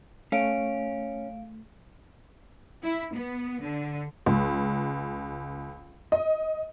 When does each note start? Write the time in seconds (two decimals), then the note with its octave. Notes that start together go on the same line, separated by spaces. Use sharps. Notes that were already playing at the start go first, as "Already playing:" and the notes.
0.32 A3 C#4 F5 D7
2.84 E4
3.14 B3
3.62 D3
4.26 C#2
6.12 D#5